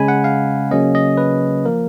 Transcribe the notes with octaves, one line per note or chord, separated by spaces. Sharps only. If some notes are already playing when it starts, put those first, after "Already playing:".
Already playing: C#3 G#3 C#4 G#5 B5
F#5
F5
C#3 F#3 A#3 C#4 D#5
D#5
B4
F3 A#3 A#4